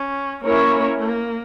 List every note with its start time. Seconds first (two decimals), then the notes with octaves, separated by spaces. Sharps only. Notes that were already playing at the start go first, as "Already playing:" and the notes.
Already playing: C#4
0.45 A#3 C#4 E4 A#4 C#5
1.00 A#3